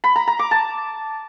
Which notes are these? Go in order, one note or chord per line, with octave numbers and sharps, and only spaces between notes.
B5
A#5
A#5
D6
A5